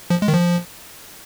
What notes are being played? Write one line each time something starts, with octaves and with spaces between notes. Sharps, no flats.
F3
G#3
D#3
F3